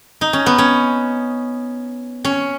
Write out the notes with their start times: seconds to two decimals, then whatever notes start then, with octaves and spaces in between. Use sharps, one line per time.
0.21 D#4
0.33 C#4
0.46 B3
0.58 C#4
2.24 C#4